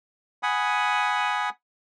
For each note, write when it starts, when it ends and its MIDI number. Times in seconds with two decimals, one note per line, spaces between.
0.43 1.50 78
0.43 1.50 80
0.43 1.50 83
0.43 1.50 87